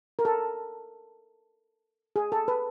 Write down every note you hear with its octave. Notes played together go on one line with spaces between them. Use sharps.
A#4
A4
G#4
A4
B4